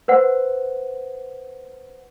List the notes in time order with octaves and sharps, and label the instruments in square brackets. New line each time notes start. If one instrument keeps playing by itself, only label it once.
[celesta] B4 C5 F#5